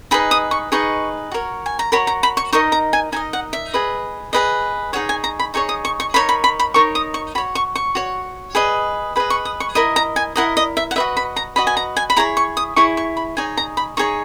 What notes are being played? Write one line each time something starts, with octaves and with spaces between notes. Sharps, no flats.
D#4 G#4 B4 D#5 B5
D#6
C#6
D#4 G#4 B4 D#5 C#6
F#4 A#4 C#5
G#5
A#5
F#4 A#4 C#5 B5
A#5
B5
C#6
D#4 A#4 D#5 C#6
A#5
G#5
D#4 A#4 D#5 G#5
F#5
E5
G#4 B4 D#5
G#4 B4 D#5
D#4 G#4 C#5 F#5
G#5
A#5
B5
D#4 G#4 C#5 C#6
D#6
C#6
C#6
D#4 A#4 C#5 B5
B5
B5
B5
D#4 A#4 C#5 C#6
D#6
C#6
F#4 C#5 B5
C#6
C#6
F#4 C#5
G#4 B4 D#5
G#4 B4 D#5 B5
C#6
D#6
C#6
E4 A#4 D#5 B5
A#5
G#5
E4 A#4 D#5 F#5
D#5
E5
F#5
F#4 B4 D#5 E5
B5
A#5
F#4 B4 D#5 B5
G#5
A#5
G#5
B5
E4 G#4 C#5 A#5
C#6
D#6
E4 G#4 C#5 C#6
C#6
B5
D#4 G#4 C#5 G#5
A#5
B5
D#4 G#4 C#5 C#6